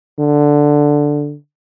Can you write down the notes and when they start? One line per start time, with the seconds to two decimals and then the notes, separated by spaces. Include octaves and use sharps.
0.19 D3